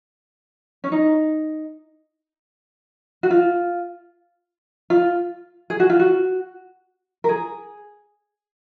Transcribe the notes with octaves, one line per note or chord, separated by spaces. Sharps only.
C#4
D#4
F#4
F4
F4
G#4
F#4
F4
F#4
A#4
G#4